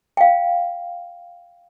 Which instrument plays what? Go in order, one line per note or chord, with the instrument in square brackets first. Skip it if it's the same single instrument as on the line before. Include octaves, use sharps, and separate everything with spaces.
[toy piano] F5 G5